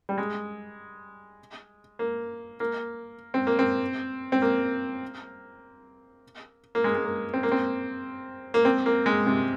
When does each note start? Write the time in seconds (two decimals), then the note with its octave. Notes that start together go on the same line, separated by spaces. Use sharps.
0.09 G3
0.18 G#3
1.99 A#3
2.60 A#3
3.34 C4
3.47 A#3
3.59 C4
4.32 C4
4.42 A#3
6.75 A#3
6.84 G#3
6.95 G#3
7.05 A#3
7.33 C4
7.43 A#3
7.52 C4
8.54 A#3
8.65 C4
8.86 A#3
9.06 G#3
9.26 C3